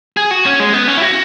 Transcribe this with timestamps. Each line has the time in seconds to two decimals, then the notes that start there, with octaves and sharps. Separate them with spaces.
0.17 G#4
0.31 F#4
0.46 C#4
0.60 G#3
0.74 B3
0.88 C#4
0.97 E4
1.02 F#4